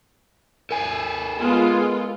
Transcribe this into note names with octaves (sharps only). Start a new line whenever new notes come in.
A4 A#4 G#5
G#3 B3 F4